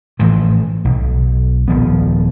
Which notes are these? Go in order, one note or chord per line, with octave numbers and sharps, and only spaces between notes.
A2 E3 F3
B1
D#1 F3 B3